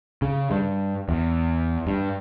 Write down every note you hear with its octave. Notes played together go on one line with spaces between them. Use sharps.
C#3
G2
E2
G2